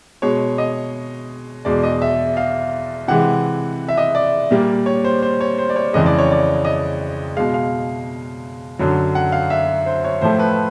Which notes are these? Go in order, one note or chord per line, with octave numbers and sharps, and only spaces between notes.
B2 G#3 C#5
D#5
E2 B2 G#3 D5
D#5
E5
F5
C3 E3 G#3 F#5
E5
D#5
D5
A#2 G3 A#3
C#5
C5
C5
C#5
C5
D5
C#5
F2 C#3 E3 G#3 D#5
D5
C#5
D5
D#5
B2 G#3 F5
F5
F#2 D3 F#3
F#5
F5
E5
C5
C#5
A2 F3 A3 C5
B4